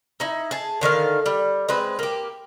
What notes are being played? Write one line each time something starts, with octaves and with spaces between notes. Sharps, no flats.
D#4 E4
G#4 A5
D3 D#3 B4 F5
G3
G#3 C4 B4
A#3 G4